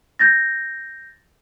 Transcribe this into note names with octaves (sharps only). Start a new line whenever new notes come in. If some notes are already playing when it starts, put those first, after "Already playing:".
G6 A6 A#6